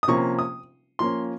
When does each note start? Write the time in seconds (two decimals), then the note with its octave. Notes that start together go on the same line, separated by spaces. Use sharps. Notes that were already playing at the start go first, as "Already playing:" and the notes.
0.03 D#6
0.08 C3 F3 A#3 C#4 C#6
0.39 D#6
0.99 F3 A#3 C#4 C6